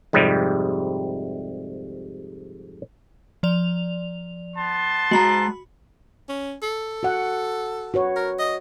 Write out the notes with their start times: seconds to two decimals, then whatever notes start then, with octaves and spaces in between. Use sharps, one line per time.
0.13 F2 G#2 C3 G3
3.43 F3 D5 F7
4.56 B3 A5 C6
5.11 G#3 F#4 A#5 B5
6.29 C#4
6.62 A4
7.03 F#4 F#5
7.94 F#4 B4 C#5
8.16 A#4
8.39 D#5